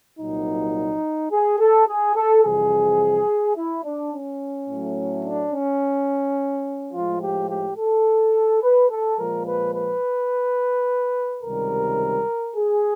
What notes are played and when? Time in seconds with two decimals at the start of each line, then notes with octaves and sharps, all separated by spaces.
0.20 C2 A#2 F#3 D#4
1.32 G#4
1.60 A4
1.88 G#4
2.16 A4
2.44 F2 C3 E3 G3 G#4
3.57 E4
3.85 D4
4.13 C#4
4.70 A2 F#3 A3
5.26 D4
5.53 C#4
6.94 A2 F3 G#3 F4
7.22 G4
7.50 G4
7.78 A4
8.63 B4
8.90 A4
9.18 A#2 F3 G#3 A#4
9.47 B4
9.75 B4
11.43 C#2 C3 D#3 G3 A#4
12.56 G#4